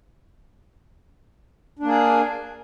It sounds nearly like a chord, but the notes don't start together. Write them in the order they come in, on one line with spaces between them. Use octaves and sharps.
D4 A#3 G#4